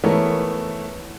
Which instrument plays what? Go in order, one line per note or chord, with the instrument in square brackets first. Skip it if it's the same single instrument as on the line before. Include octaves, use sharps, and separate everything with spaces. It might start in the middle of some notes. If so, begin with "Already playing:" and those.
[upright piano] E3 A3 B3 A#4 C#5